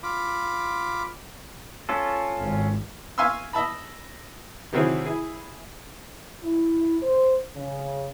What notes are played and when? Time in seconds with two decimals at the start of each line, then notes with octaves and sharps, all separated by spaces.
0.03 F4 B5 D6
1.89 C#4 F4 A4
2.39 G#1
3.18 E5 F5 G#5 C6 C#6 E6
3.53 D#5 E5 A5 B5
4.72 C3 D#3 F#3 C4 E4 G#4
5.05 E4 G#4
6.44 E4
7.02 C5
7.56 C#3